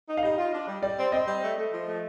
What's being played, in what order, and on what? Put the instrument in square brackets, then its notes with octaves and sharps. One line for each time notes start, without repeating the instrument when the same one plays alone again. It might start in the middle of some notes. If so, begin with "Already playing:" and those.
[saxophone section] D#4
[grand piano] F5
[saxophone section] G3 [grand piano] D#5
[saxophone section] F4
D4
G3
[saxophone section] G3 [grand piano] D5
[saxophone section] C4
[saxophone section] C4 [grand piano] D#5
[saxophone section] G3
A3
A3
F3
A3